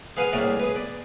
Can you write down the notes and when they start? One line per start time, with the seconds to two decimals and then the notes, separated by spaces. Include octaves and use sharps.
0.17 G#4 B4 F5 F#5 G#5
0.33 C2 A2 A#3 G#4 D5
0.60 G#4 B4
0.76 D5